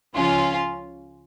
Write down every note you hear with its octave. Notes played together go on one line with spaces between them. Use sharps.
C#2 C#3 F3 C#4 F4